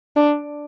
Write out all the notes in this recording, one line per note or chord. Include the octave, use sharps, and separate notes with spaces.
D4